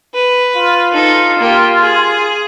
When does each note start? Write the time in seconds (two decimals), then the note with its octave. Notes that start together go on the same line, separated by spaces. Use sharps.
0.14 B4
0.56 F4
0.92 D#4 A4
1.39 A#3 G4
1.80 G#4